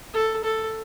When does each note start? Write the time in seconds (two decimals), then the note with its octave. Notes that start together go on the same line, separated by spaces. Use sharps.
0.14 A4
0.44 A4